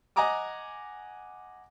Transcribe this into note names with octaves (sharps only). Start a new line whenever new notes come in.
D#5 F#5 G#5 A#5 D6 D#6